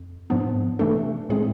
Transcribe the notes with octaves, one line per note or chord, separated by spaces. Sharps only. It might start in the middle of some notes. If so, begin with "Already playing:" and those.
Already playing: F2
G#2 F3 B3 D4
C3 E3 A3 D4 A4
A2 G#3 C4 G#4